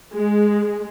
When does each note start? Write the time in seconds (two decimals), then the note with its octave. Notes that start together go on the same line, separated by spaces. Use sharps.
0.15 G#3